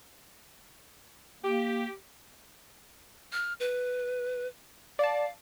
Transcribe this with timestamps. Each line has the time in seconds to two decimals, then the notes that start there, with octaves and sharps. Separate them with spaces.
1.43 A#3 G4
3.33 F6
3.60 B4
4.99 D5 F5 A5